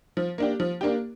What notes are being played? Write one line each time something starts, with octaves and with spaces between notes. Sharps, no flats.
F3
A#3 D4 G4
F3
A#3 D4 G4